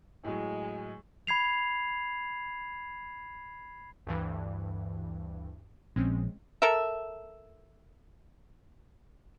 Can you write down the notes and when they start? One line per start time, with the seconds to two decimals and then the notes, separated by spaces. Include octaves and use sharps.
0.25 A2 F#3 G#3
1.27 B5 G#6 C7 F7
4.07 D2 G2 E3
5.96 A#1 G#3 C4 C#4
6.62 A4 A#4 E5